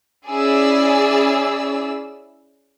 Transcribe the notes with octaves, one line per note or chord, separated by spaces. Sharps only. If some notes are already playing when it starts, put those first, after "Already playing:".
C#4 E4 G#4 D5 E6